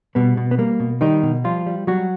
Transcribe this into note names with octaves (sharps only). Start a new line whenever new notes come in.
B2 G3 B3
B2
B3
G3 A#3
B2
D#3 G3 D#4
B2
F3 G3 F4
G3
F#3 G3 F#4